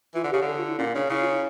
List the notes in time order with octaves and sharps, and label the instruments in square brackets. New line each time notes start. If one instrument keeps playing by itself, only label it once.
[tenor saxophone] E3 [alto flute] F4
[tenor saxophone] D3
[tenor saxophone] C#3 [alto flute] G4
[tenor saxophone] D3 [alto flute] A4
[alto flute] F4
E4
[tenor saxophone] A#2 [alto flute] C#4
[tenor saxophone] C#3 [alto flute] D4
[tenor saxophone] C#3 [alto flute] E4
[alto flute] F4
E4